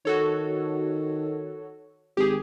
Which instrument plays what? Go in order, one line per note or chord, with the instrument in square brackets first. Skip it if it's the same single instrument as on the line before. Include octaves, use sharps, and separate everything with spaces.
[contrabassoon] D#3 [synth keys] F#4 A4 C#5
[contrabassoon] G#1 [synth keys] G4 G#4